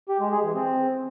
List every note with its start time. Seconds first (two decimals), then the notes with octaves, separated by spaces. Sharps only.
0.09 G4
0.20 G#3
0.31 G#4
0.43 E3
0.54 C4